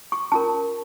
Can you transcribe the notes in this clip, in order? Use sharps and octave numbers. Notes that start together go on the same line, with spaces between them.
C#6
C#4 F4 A#4 A5